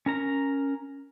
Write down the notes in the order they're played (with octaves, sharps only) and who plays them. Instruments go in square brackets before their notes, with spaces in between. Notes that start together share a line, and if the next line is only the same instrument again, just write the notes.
[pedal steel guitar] C#4 A#4 A#5